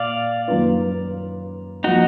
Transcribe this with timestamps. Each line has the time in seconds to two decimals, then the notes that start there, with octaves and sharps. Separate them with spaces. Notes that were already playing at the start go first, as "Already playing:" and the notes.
Already playing: A#2 D5 F5
0.48 F#2 D#3 A#3 F4 B4
1.84 F3 A#3 D#4 F4 F#4